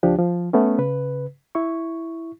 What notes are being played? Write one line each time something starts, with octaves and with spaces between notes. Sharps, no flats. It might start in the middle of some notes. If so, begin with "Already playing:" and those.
C#2 F3 D4 G4
F3
A3 B3 C#4
C#3 B4
E4 C#6